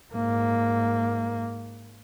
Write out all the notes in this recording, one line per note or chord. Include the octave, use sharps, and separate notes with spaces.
G#2 A#3